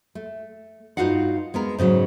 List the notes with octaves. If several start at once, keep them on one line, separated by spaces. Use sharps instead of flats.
A3
G2 D#4 F4 F#4 F5 F#5
G#3 B3 A#4
G#2 C#3 E3 F#3